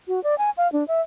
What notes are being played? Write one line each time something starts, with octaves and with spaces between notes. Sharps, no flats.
F#4
D5
G#5
F5
D4
E5